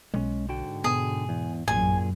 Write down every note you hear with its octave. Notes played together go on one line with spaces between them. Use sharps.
B1 G#3 C#4
G#2 D3 F#4 G5
B2 G#4
E2
A1 F#2 A#2 G#4 G#5